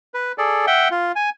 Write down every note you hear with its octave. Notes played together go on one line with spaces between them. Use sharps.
B4
G#4 A4 D5
E5 F#5 G5
F4
G#5